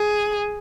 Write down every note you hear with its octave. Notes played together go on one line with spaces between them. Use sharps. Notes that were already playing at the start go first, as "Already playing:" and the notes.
Already playing: G#4